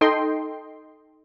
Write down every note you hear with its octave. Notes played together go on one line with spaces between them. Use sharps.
D#4 A4 D#5 G5 C6